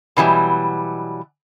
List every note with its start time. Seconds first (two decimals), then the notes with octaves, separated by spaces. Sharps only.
0.17 B2 E3 F#3 G3